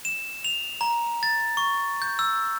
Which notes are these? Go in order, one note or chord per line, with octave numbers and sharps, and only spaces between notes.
E7
F7
A#5
A6
C#6
G6
E6